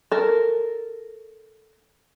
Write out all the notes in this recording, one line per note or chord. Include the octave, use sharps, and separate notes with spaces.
A4 A#4